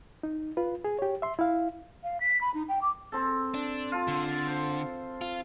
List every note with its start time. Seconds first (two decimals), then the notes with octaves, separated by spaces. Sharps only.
0.23 D#4
0.57 F4 B4
0.84 G#4
0.99 G4 C#5
1.22 E5 C6
1.39 E4 F5
2.03 F5
2.20 B6
2.41 B5
2.54 D#4
2.68 G5
2.82 D6
3.12 C4 A4
3.54 D4
3.92 F4 A5
4.08 D3
4.47 C5
5.21 F4